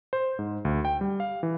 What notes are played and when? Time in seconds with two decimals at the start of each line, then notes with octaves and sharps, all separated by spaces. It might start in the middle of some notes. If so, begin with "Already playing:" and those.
0.13 C5
0.39 G#2
0.65 D2
0.85 G5
1.01 G3
1.20 F5
1.43 E3